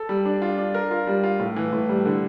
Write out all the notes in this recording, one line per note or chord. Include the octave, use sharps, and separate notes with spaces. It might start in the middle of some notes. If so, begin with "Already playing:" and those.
Already playing: A4
G3
D4
F4
D4
A#4
F4
G3
F4
A2
E3
A2
G3
D3